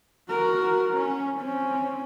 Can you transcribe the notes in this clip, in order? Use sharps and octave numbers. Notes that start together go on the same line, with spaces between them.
F#4 A#4
C#4
C4 C#4